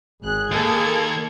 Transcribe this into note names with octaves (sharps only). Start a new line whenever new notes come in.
G#1 G#4 F#6
D#2 A#3 A4 G#6